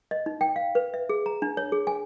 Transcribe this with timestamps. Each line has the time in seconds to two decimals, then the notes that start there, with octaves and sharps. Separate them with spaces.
0.11 D#5
0.26 D#4
0.41 G5
0.56 F5
0.75 B4
0.94 E5
1.09 G#4
1.26 A#5
1.42 D4
1.57 C#5
1.72 G#4
1.87 G#5